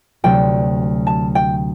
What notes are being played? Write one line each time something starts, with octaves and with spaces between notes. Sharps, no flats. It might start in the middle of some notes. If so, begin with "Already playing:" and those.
D2 C3 F#3 C4 G5
A5
G5